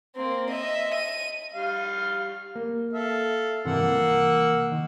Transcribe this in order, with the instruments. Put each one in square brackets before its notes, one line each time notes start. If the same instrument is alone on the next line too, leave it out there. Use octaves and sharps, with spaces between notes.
[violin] A#3 C4
D#5 E5
D#7
[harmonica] G3 F5
[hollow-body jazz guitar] A#3
[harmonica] A4 E5 F5
[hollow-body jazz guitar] G2 C3 E3 [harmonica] A#3 F#5 E6
[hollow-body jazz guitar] C2 E3
D#3